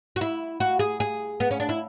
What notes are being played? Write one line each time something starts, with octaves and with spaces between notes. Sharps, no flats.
F#4
E4
F#4
G#4
G#4
B3
C#4
D4
E4